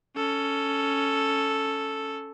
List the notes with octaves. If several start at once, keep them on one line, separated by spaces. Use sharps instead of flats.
C#4 A4